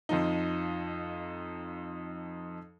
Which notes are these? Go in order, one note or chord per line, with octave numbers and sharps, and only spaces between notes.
F2 F3 D#4